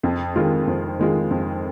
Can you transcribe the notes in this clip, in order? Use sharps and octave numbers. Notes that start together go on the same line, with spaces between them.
F2
D#3 G#3 F4
F2
D#3 G#3 F4
F2